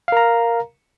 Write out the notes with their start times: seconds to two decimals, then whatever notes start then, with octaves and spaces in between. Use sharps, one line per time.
0.08 F5
0.12 A#4
0.17 A#5